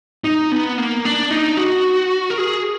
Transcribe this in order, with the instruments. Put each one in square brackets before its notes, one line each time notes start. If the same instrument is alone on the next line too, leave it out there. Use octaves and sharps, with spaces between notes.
[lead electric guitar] D#4
B3
A#3
D4
D#4
F#4
A#4
G#4